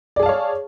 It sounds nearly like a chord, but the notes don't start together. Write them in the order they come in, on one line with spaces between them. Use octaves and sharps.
D5 G#4 A5 F5 C#5